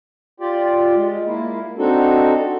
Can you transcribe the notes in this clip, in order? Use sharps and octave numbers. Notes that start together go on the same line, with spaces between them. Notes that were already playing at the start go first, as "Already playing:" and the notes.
F4 G4 D5
G#3
A#3 E4
C4 D4 D#4 F#4 A4